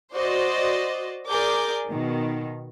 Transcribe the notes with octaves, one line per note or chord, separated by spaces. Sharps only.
F#4 C5 D5 D#5
G#4 A#4 D5 D6 G6
B2 D#3